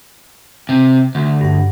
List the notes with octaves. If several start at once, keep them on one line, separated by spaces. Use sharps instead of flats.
C3
D2
G2 F#5